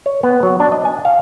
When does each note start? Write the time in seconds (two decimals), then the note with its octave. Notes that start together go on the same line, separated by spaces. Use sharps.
0.06 C#5
0.23 B3
0.43 F#3
0.60 D4
0.72 D#5
0.85 G#5
1.05 F5